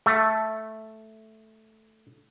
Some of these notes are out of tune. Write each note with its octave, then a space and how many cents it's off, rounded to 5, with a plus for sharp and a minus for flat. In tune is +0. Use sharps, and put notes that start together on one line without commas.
A3 -5